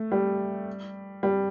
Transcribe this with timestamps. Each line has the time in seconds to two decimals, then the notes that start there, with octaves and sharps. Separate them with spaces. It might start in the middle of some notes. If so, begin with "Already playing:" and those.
Already playing: A3
0.12 G3
1.23 G3